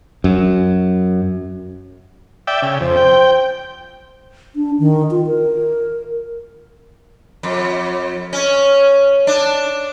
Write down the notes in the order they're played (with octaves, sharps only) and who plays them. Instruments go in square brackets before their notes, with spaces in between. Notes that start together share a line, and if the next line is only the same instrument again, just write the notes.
[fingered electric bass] F#2
[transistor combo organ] D5 E5 G5
C#3
[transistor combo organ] F2 [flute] C5
[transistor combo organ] G5
[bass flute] D4
D#3
F4
A#4
[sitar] F2
C#4
D4